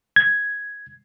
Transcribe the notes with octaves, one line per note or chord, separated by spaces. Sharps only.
G#6